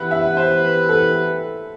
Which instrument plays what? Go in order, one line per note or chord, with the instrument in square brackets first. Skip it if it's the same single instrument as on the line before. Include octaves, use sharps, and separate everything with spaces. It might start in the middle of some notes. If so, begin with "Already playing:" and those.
Already playing: [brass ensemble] E3 B3 E4 G4 B4 [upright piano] F#5
[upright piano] E5
C5
A4